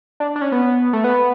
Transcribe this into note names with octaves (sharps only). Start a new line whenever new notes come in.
D4
D4
C#4
B3
A3
B3